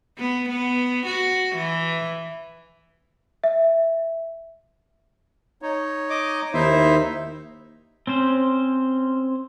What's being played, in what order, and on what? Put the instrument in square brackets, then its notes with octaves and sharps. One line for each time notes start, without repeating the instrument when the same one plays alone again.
[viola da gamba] B3
B3
F#4
E3
[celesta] E5
[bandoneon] D#4 C#5
[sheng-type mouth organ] D#5 D6
[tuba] D#2 [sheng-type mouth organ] D#4 C5 [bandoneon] E4 E5
[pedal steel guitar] C4 C#4 C5